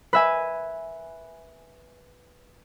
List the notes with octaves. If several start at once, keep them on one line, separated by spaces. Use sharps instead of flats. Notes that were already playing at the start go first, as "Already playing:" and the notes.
B4 E5 G#5